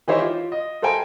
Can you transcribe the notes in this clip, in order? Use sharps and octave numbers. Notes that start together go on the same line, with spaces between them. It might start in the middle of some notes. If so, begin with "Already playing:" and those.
E3 D#4 G4 C5 C#5 E5
F4
D#5
A4 C5 F5 G5 G#5 A#5